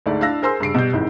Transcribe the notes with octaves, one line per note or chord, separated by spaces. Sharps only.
D2 G#2 A3 D5
D4 E4 F5 E6 A#6
G#4 A#4 C5 G#5 C6 E6
G2 C#3 C7 D7
B2 G3 G6
G#1 G#2 E3